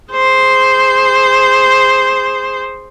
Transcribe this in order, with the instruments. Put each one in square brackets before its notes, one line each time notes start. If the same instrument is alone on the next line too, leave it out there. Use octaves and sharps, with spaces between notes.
[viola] G#4 C5